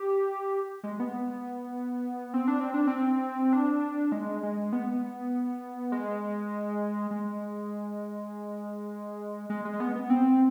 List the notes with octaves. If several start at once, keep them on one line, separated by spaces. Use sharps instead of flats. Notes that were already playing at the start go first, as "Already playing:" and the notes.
Already playing: G4
G#3
B3
C4
D4
C4
D4
C4
D4
G#3
G#3
B3
G#3
G#3
G#3
G#3
B3
B3
C4